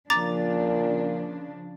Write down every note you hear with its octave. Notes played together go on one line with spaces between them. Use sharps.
A#2 C#3 F3 D4 A#5 D6 A6